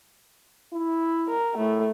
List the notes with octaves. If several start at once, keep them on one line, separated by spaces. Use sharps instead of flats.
E4
A#4
A2 A3